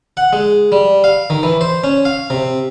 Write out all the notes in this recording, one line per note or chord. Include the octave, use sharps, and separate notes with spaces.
F#5
G#3
G3
F5
D#3
E3
C5
C#4
F5
C3